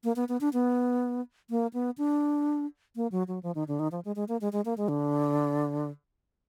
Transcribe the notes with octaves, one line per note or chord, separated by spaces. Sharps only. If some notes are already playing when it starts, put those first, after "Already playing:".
A#3
B3
B3
D4
B3
A#3
B3
D4
A#3
F#3
F#3
F3
D#3
D3
D#3
F3
G#3
G#3
A#3
G#3
G#3
A#3
G#3
D3